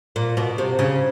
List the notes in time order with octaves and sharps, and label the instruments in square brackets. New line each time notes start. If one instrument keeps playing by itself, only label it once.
[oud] A#2
B2
C3
C#3